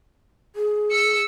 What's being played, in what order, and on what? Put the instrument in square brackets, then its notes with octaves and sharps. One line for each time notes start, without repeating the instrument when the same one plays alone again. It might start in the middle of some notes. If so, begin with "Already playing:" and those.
[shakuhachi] G#4
[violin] E6 C#7